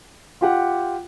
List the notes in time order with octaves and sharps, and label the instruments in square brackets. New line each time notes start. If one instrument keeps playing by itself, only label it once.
[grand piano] F4 G4 F#5